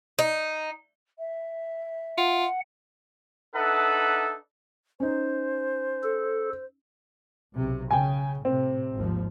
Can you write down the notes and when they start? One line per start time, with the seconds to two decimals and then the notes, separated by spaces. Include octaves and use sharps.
0.19 D#4
1.19 E5
2.17 F4 F#5
3.55 D4 D#4 A4 B4 E5 F#5
5.00 C#4 D#4 C5
6.03 A4
7.55 B1 C3
7.91 C#3 G5 G#5
8.45 A2 C3 C4
8.95 G#1 D#2 F3